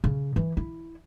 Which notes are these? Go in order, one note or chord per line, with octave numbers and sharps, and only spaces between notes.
C#3
E3
E4